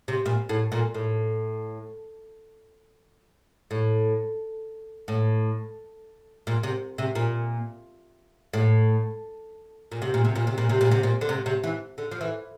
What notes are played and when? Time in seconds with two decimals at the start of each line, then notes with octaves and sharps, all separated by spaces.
0.08 C3
0.26 A#2
0.49 A2
0.72 A#2
0.94 A2
3.71 A2
5.08 A2
6.47 A#2
6.63 C3
6.98 C3
7.15 A#2
8.53 A2
9.92 A#2
10.02 C3
10.14 A#2
10.25 C3
10.36 A#2
10.47 C3
10.58 A#2
10.69 C3
10.81 A#2
10.91 C3
11.03 A#2
11.21 D3
11.29 C3
11.46 C3
11.64 E3
11.98 D3
12.11 F3
12.21 E3